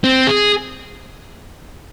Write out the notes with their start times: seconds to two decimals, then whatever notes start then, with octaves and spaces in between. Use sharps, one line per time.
0.04 C4
0.27 G#4